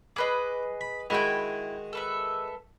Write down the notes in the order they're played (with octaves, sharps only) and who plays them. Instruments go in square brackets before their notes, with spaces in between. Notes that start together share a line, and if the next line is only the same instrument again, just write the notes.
[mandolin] G#4 B4 D#5 [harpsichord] D6
[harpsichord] B5
[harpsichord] D#3 G#3 F#4 [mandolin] E4 G5
[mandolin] A4 B4 E5